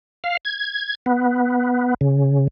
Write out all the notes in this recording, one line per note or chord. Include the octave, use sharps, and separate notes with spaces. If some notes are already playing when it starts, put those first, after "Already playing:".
F5
G#6
B3
C#3